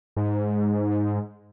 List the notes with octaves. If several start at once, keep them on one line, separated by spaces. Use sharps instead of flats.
G#2